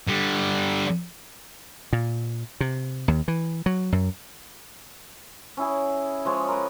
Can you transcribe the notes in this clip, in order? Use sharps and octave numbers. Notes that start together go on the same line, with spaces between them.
D3 G3
A#2
C3
D#2
E3
F#3
F#2
C#4 E4 G#4
F3 G#3 C#5
A#4 B4